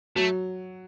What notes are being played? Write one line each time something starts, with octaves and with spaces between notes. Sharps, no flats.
F#3 A3